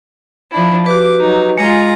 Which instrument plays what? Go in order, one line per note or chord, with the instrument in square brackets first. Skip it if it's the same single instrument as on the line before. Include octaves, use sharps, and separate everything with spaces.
[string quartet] F3 D4 E4
[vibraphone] F#4 G4 B4 [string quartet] D6
[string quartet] F#3 D#4
[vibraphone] G#3 D#5 [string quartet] F4 G#4 A#5